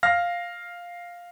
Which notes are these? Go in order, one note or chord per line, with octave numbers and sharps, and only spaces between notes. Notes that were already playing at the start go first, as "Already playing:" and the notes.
F5 F6 A#6